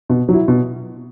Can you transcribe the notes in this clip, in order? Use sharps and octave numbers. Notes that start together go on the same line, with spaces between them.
B2
F#3 E4
B2